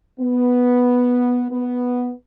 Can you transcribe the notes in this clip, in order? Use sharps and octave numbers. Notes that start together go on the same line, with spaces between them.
B3
B3